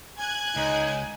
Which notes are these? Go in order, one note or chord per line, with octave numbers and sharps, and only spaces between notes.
G#5 F#6 G#6
C#2 D#4